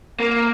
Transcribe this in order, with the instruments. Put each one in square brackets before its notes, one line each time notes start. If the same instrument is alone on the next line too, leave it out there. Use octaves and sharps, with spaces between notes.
[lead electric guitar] A#3